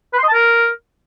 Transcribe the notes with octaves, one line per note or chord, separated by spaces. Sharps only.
B4
C6
D#5
A5
A#4